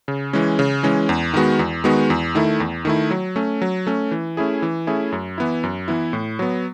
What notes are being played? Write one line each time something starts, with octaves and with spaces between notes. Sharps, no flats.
C#3
E3 G#3 C#4
C#3
E3 G#3 C#4
E2
D#3 G#3 B3 F#4
E2
D#3 G#3 B3 F#4
E2
D#3 A3 E4
E2
D#3 A3 E4
F#3
A3 C#4
F#3
A3 C#4
E3
A3 C#4 E4 G#4
E3
A3 C#4 E4 G#4
F#2
E3 B3 E4
F#2
E3 B3 E4
A2
F#3 B3